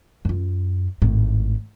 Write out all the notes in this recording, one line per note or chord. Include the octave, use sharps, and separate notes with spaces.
F#2 F4
G#1 A2